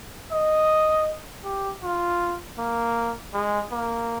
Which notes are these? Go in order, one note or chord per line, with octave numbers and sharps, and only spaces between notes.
D#5
G4
F4
A#3
G#3
A#3